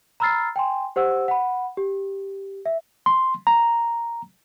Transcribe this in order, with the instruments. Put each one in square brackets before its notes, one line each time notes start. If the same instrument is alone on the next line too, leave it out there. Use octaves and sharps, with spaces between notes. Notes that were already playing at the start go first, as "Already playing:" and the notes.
[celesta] A#5 B5 E6 F6 A6 C7
G5 G#5 C6
G4 C5 F#5 E6
F#5 B5
G4
E5
[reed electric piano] C6
A#5